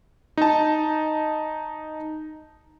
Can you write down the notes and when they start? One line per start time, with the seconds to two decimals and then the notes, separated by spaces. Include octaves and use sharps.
0.37 D#4 A5